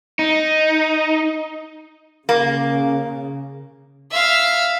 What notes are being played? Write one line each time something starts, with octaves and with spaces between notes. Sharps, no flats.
D#4
C#3 A#3
E5 F5